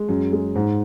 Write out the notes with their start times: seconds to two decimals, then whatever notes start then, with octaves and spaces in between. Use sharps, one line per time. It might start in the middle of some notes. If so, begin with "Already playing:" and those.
Already playing: G#3
0.09 F#2
0.33 G#3
0.55 G#2